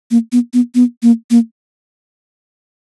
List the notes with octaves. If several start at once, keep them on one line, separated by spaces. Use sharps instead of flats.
A#3
B3
B3
B3
A#3
A#3